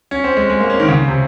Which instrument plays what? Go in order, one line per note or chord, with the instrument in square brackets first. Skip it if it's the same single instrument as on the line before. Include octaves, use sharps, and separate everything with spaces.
[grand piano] C#4
C4
G#3
G#3
A#3
C#4
D#3
C#3
C3